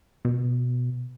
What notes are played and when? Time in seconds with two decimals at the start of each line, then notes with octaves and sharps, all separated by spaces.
0.25 B2